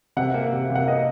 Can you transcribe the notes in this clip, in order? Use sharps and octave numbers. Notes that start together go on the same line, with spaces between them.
C3 F#5
A#3
C3
C3
F#5
A#3 D#5